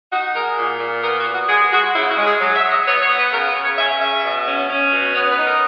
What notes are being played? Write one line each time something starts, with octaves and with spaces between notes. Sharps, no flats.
D#4 F#4
G#3 A#4
A#2
A#2
B3 A#4
F#4
B3
F#4
G#3 G#4
G#3 F#4
C#3 E4
F#4
G#3
G#4
F#3
E5
F#3
D#5
B3 C#5
C#5
B3
B4
C#3 A#4
B4
C#3
C#5
C#4 E5
C#3 E5
B2
C#4
C#4
B2
B3 C#5
B4
D#4
A#4